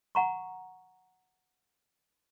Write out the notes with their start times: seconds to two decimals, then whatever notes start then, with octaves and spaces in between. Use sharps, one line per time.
0.15 F#5 A#5 C#6